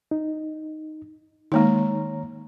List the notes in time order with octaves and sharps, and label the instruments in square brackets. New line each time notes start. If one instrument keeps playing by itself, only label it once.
[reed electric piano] D#4
[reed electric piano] D#3 C#5 A#5 [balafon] G#3 A#3 D#4